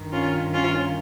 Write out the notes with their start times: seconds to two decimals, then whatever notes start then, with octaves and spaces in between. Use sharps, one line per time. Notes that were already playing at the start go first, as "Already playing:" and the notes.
Already playing: G2 D#3
0.12 C#4 F4
0.53 C#4 F4